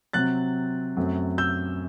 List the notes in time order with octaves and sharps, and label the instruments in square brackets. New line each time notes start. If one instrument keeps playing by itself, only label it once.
[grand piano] C3 F#3 C4 F#6 A6
F#2 F#3 A3 C4
E6 G6